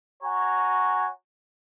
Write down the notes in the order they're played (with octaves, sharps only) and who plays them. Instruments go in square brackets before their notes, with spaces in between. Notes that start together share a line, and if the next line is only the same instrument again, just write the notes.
[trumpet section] F#4 C#5 G#5 A#5